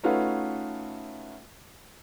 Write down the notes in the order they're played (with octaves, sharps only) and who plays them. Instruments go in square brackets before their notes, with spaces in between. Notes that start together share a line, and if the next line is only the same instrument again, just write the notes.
[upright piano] A3 C#4 D#4 F4 F#4 B4